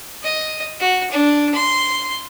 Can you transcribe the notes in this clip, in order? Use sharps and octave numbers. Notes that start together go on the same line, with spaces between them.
D#5
F#4
D4
C6